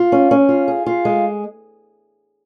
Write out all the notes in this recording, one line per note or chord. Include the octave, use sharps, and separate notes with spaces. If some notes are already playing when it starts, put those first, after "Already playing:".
Already playing: F4
C#4
C#4
F4
G#4
F4
G#3